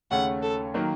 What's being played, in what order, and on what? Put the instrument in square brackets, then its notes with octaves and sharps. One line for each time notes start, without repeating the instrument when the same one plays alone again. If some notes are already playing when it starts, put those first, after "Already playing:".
[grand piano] D#2 C#3 A3 C#4 [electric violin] F#5
[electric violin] A4
[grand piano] D#3 F#3 A#3